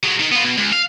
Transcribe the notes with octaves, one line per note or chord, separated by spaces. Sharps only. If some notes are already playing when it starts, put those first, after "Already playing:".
F#3 G#3
D#3 D#4
B3 F4
B2
C#2
F5